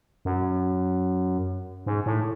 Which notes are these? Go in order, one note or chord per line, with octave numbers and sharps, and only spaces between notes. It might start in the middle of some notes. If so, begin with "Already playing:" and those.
F#2
G#2
A2